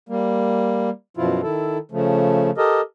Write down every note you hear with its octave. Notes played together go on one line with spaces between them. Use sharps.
G3 A#3
F#2 B2 F3 E4 F4
D#3 E4 A4
C#3 F3 A3
G4 A4 A#4 D#5